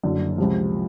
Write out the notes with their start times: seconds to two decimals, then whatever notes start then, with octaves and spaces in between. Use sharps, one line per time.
0.03 F#1 F#2 D3
0.38 C#2 C3 F3